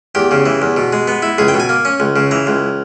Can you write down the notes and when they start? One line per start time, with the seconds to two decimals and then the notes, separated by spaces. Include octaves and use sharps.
0.15 E2 G4
0.31 C#3
0.46 E3
0.62 E2
0.77 B2
0.93 G#3
1.08 B3
1.22 E4
1.38 C#2 G#4
1.48 G5
1.54 B2
1.60 G#5
1.69 A#3
1.85 C#4
2.00 C#2
2.16 C#3
2.31 E3 A#5
2.47 C#2